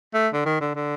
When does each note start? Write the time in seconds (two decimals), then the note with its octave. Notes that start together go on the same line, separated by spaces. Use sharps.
0.14 A3
0.33 D3
0.45 D#3
0.61 D3
0.75 D3